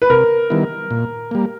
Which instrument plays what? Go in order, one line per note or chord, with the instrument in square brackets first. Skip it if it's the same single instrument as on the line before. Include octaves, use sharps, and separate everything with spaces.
[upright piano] B4
[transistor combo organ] C3 [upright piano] A#4
[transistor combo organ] D#3 G3 B3 E4
A#2
G3 A#3